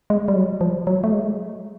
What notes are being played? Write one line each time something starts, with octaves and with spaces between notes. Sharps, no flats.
G#3
G3
F#3
F3
F#3
A3
G#3